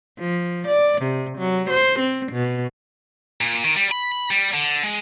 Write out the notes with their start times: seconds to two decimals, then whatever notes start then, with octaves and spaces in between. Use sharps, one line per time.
0.19 F3
0.68 D5
1.02 C3
1.39 F#3
1.70 C5
2.00 C4
2.32 B2
3.41 A#2
3.64 D#3
3.76 G3
3.91 B5
4.31 G3
4.54 D3
4.83 G#3